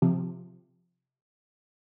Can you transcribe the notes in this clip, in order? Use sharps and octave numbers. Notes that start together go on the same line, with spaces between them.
C3 F3